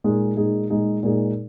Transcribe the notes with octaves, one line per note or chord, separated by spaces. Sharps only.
A#2 G#3 D#4 G#4
A#2 G#3 D#4 G#4
A#2 G#3 D#4 G#4
A#2 G#3 D#4 G#4